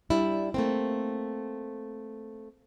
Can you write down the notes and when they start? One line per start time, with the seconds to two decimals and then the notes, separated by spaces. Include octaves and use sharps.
0.10 G3 D4 E4
0.54 A3 A#3 C4